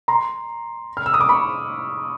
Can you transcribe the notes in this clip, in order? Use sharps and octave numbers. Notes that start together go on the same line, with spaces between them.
A#5 C6
F6
E6
D#6
D6
B5 C#6